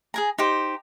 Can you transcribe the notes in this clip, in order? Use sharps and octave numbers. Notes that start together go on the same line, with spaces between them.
G#4 G#5 A#5
D#4 G4 C5